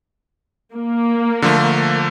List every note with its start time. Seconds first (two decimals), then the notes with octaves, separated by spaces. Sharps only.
0.73 A#3
1.42 D3 F3 A3